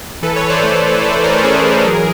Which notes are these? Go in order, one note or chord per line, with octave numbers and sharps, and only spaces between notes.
E3 A4 B4
B4 C#5
E3
C5 D5
A3 B4 C#5
E3
A3 A4 B4
A4 B4
E3 A#4 C5
A4 B4
C#4 G#4 A#4
E3
F#3